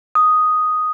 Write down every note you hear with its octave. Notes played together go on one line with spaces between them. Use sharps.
D#6